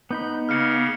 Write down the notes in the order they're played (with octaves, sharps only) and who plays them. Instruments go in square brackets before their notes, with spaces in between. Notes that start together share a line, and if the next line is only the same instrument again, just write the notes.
[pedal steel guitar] B3 D#4 B5 [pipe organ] G6
[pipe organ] C#3 A#3 [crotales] F6 C#7